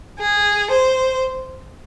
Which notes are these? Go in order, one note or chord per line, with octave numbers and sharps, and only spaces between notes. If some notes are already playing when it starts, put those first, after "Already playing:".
G#4
C5